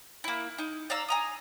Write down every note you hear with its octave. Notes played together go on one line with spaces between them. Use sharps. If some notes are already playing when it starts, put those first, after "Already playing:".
A#3 E4
D#4
D5 F5 A#5 E6
G#5 A#5 D#6